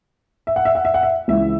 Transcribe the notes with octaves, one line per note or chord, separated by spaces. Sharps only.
E5
F#5
E5
F#5
E5
F#5
E5
C#2 C#3 E3 E5